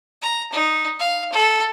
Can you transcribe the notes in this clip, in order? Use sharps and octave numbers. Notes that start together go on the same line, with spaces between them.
A#5
D#4
F5
A4